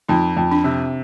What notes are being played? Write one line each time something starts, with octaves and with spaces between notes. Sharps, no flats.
F2 D#4
F2
D4
C3